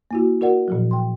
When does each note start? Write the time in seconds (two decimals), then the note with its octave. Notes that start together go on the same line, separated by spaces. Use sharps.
0.11 A#3 E4 F#4
0.41 F#4 A#4 D5 F#5
0.68 A#2 F3 F#3
0.91 G5 C6